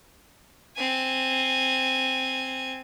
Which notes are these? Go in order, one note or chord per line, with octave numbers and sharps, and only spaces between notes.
C4 G#5